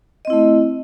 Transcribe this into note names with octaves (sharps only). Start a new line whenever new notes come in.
A3 C4 E4 D#5